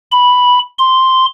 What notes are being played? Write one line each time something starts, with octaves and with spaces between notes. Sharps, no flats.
B5
C6